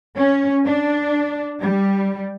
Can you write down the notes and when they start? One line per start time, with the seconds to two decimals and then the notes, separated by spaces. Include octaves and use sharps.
0.17 C#4
0.66 D4
1.61 G3